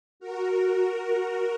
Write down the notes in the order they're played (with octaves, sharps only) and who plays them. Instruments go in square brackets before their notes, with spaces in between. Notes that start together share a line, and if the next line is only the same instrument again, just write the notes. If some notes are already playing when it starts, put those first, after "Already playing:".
[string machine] F#4 A#4